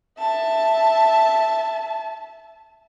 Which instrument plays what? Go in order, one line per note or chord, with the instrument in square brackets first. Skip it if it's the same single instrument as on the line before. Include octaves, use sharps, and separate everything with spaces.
[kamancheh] E5 A5